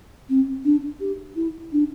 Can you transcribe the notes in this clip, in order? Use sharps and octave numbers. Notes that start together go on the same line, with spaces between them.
C4
D4
G4
E4
D4